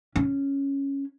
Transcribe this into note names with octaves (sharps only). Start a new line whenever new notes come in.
C#4